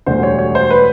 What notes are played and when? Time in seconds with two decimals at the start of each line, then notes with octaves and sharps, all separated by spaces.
0.06 E1 D2 D3 G3 C5
0.23 C#5
0.39 C#5
0.55 C5
0.70 B4